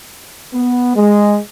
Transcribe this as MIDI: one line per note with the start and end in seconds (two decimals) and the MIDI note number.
0.54 0.94 59
0.96 1.39 56